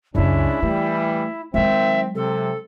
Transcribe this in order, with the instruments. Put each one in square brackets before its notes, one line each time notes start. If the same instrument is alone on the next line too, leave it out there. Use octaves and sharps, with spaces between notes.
[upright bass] C#2 F#2 [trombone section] G#3 C#4 D4 [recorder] E4
[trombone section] E3 G3 [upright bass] A3
[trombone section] D#3 C4 [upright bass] F#3 G#3 [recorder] E5
[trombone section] C3 [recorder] A4